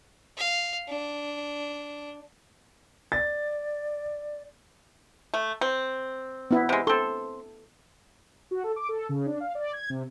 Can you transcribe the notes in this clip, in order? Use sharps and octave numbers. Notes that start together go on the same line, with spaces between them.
F5
D4
D5 A6
A3
C4
B3 E4
C3 G#3
C4 A4 C6
F#4
A4
D6
A4
C#3
D4
F5
D5
G#6
C3